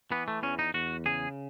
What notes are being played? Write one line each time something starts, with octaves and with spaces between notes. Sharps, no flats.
E3 B3
A3
E2 C#4
D#4
E2 F#4
C#3 G#4